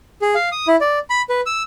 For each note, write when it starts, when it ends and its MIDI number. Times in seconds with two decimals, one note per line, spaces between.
0.22 0.35 68
0.35 0.49 77
0.52 0.67 87
0.68 0.76 64
0.81 0.99 74
1.10 1.22 83
1.29 1.41 71
1.46 1.63 88